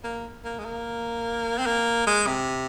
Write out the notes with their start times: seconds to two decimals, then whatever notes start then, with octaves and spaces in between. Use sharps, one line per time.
0.04 A#3
0.45 A#3
0.59 G#3
0.65 A#3
1.59 C4
1.66 A#3
2.07 G#3
2.27 C3